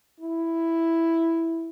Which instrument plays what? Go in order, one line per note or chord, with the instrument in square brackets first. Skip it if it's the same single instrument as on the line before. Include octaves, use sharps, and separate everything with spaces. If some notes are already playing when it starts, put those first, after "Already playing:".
[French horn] E4